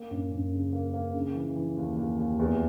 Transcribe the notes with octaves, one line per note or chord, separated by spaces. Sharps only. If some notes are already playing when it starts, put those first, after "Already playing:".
Already playing: A#3
F#2
F#2
C#3
A#3
A#3
C#3
E3
E3
D#2
D#2
D#2
E2